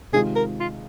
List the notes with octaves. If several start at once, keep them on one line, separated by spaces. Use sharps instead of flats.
C3 D#3 G#3 F4 G#4
A#4
F4